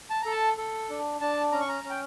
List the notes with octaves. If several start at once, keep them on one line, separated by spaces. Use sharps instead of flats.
A5
A4 A#5
A5
A4
D4
D4 A5
C#4 A#5
C#6
A#5
C#4
G5